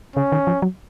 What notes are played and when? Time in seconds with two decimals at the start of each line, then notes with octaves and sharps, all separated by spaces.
0.16 C#3 C#4
0.32 D#3
0.47 F3
0.62 F#3